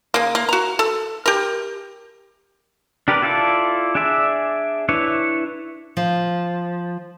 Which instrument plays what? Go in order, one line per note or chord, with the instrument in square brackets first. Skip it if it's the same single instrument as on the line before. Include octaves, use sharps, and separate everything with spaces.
[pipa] C#3 A#3
A#3
F#4 A#5
A4
G4 A#4
[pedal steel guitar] D4 G4 A#4 B4 D5
E4 F4 A4 D5 A5
D4 G#4 D5 E5
D4 E4 B4 C#5
[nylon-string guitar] F3